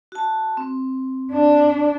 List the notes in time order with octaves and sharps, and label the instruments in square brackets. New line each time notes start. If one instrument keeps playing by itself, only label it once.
[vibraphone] F#4 A5
C4
[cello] D4